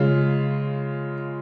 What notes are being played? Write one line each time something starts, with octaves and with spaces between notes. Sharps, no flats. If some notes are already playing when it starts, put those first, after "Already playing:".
Already playing: C#3 G#3 F4